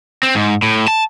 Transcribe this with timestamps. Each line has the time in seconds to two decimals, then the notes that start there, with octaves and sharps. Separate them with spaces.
0.23 C4
0.35 G#2
0.63 A2
0.88 A5